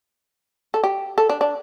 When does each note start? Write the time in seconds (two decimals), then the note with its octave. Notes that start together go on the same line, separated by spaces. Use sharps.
0.74 A4
0.84 G4
1.18 A4
1.30 D4
1.41 D4